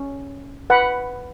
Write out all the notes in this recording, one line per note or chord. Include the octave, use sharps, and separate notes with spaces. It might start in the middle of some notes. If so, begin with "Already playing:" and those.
Already playing: C#4
B4 F#5 B5